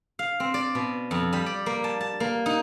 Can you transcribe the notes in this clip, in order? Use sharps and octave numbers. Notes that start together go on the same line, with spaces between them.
F5
C4
D5
B2
F2
G3
D5
A#3
A5
A5
A#3
D#4